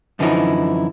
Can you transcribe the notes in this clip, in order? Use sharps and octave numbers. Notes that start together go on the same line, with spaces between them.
F#2 D3 E3 F3 D#4 E4